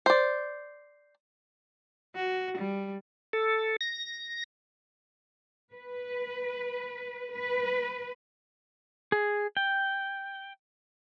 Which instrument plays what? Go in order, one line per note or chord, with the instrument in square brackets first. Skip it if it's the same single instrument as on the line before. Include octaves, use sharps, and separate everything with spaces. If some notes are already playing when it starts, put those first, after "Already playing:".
[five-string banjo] C5 D5
[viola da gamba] F#4
G3
[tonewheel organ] A4
A#6
[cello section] B4
B4
[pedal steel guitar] G#4
G5